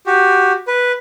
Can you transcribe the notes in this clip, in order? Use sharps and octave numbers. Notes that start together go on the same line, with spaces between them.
F#4 G4
B4